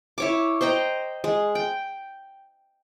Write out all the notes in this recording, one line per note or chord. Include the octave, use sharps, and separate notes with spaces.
E4 C#5 D6
C5 D#5 G5 A#5
G#3
G5